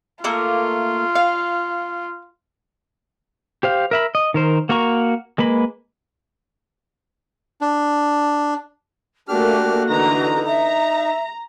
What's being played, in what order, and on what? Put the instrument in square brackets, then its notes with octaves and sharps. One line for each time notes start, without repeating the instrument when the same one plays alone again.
[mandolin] A3 A#3 A#4 [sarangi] F4
[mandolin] F5
[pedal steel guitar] G4 C5 F5
A#4 E5 B5
D#5
D#3 A#4 C5
A#3 F#4 A#4 A#5 C#6
G#3 A#3 B4 B5
[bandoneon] D4
[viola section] A3 A#3 [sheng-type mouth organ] D4 G4 F6 [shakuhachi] F#4
[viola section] D3 E3 A#5 [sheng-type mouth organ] D#4
[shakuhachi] E5 [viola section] A#5